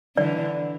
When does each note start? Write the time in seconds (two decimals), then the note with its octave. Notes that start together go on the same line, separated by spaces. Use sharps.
0.16 D3 E3 D5